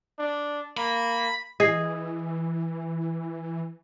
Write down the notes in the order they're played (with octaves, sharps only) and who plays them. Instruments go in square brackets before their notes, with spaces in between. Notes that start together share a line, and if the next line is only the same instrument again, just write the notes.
[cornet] D4
[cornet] A#3 [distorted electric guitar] B5
[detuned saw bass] E3 [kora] G#4 [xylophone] D#5 C7